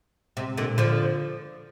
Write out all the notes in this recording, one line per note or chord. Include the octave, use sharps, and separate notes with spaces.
C3
A#2 D3
D3 F3